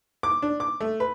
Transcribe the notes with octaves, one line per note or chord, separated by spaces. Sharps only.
D6
D4
D6
A3
B4